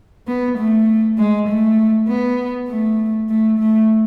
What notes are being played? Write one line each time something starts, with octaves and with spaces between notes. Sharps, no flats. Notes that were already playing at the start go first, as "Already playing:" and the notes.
B3
A3
G#3
A3
B3
A3
A3
A3